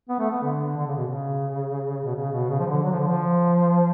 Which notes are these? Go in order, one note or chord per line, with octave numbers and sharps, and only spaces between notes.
B3
A3
B3
D3
D3
C#3
B2
C#3
B2
C#3
B2
C#3
F3
D3
F#3
F3
D3
F3